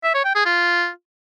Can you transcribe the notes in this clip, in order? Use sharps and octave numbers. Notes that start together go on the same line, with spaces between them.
E5
C#5
G5
G#4
F4